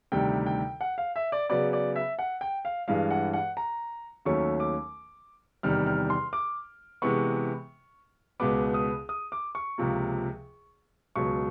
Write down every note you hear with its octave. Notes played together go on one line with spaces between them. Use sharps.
D2 C3 D#3 G3 G5
G5
F#5
F5
E5
D5
C#3 F#3 B3 D5
D5
E5
F#5
G5
F5
G2 E3 G#3 F5
F#5
F#5
A#5
D#2 D#3 F#3 A3 C#4 C#6
D6
E2 C3 D#3 G3 F6
F6
C6
D6
C3 E3 G#3 B3 C#6
C#2 B2 G#3 B3 D6
D#6
D#6
D6
C#6
C#2 C3 F3 A#3
C#2 B2 F#3 C#6